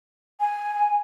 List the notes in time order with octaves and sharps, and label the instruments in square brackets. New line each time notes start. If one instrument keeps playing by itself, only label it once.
[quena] G#5